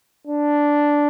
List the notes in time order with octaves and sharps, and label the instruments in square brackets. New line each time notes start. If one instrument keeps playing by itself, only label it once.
[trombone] D4